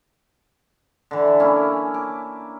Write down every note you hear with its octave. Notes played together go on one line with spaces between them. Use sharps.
D3 E3
A#3 C#4 E4
D6